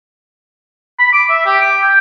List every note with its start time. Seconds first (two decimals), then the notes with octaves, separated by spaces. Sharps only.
0.99 B5
1.13 D6
1.30 E5
1.46 G4
1.61 D6
1.82 G5